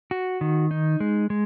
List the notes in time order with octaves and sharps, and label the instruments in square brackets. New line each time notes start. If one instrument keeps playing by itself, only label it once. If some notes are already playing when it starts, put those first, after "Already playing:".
[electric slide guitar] F#4
D#3
D#4
G#3
G#3